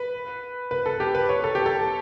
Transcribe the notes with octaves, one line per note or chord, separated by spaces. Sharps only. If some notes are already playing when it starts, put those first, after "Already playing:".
Already playing: B4
B4
A4
G4
B4
C#5
A4
G4
A4